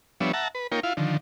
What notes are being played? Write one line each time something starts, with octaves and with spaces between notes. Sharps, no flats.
F3 G3 B3 D4 C#5 E5
E5 F#5 A5 A#5
B4
A#3 D#4 F4 A#4 C#5 G5
E4 F4 F5
D3 D#3 F3